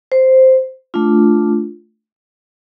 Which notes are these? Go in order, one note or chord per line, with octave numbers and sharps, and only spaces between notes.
C5
A3 D4 F4